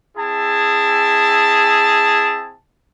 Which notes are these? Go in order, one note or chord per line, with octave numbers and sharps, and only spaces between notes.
C4 E4 G#4 A5